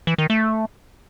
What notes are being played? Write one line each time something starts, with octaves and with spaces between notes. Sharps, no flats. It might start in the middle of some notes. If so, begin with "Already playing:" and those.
E3
D#3
A3